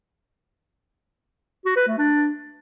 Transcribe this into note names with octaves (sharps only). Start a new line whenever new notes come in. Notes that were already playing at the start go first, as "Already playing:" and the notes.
F#4
B4
A3
D4